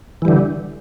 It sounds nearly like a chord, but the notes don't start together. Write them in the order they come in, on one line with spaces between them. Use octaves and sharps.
E3 G3 D3